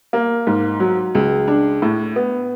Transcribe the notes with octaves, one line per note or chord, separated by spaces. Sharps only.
A#3
G#2
F#3
C#2
D4
A2
B3